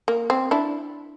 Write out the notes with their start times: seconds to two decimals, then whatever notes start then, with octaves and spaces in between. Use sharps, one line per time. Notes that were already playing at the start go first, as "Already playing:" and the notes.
0.08 A#3
0.30 C4
0.51 D4 E4